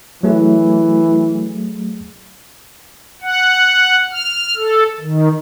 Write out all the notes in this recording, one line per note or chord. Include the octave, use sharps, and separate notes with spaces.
E3 F#3 A3 G#4
F#5
F6
A4
D#3